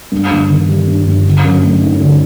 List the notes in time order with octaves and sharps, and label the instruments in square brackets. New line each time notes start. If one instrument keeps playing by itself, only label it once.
[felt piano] G2
G1
D#3
G3
G2
G1
D3
F#2
A3
D#4
D3